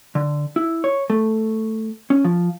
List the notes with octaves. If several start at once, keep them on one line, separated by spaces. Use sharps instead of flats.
D3
E4
C#5
A3
C#4
F3